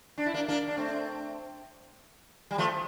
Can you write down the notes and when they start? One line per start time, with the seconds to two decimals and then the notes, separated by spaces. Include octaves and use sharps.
0.18 D4
0.26 E4
0.34 A#3 D4
0.48 A#3 D4
0.68 D4
0.77 A3 C4
2.51 G3
2.58 F3 A3